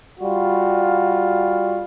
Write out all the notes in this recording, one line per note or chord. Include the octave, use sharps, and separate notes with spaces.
G3 F4 F#4